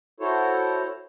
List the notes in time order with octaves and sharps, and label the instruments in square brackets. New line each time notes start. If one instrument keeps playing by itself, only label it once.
[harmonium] E4 F#4 A4 C5 C#5